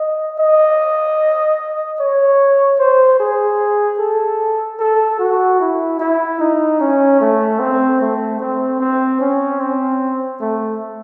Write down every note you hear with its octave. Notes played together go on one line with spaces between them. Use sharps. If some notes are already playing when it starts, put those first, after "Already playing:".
Already playing: D#5
D#5
C#5
C5
G#4
A4
A4
F#4
E4
E4
D#4
C#4
A3
C4
A3
C4
C4
C#4
C4
A3